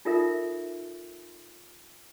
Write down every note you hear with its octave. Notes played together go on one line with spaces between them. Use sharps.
D#4 F4 A4 A#4 E5